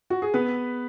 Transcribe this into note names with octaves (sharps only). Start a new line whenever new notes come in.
F#4
G#4
B3 B4